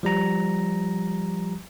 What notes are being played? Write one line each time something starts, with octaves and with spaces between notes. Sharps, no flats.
F3 G3 A#5